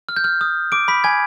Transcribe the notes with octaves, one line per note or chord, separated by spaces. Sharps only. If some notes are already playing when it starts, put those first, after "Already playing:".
F6
G6
F6
D#6
D6 D7
B5 B6
G#5 G#6